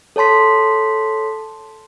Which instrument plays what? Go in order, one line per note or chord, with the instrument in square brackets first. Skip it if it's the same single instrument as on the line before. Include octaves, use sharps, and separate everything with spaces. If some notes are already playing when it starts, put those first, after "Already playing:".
[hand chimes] A4 C#5 A5 C6 B6